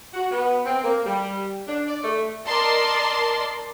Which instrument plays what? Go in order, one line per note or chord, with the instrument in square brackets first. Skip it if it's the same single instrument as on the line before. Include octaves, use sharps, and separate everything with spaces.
[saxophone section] F#4
B3
C4
A#3
G3
D4
D5
A3
[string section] A#4 D5 D#5 A5 C6